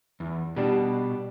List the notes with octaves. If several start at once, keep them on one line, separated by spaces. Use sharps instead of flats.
E2
B2 G3 D4